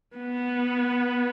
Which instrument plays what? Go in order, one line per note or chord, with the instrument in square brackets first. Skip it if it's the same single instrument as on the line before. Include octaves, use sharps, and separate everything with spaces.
[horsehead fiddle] B3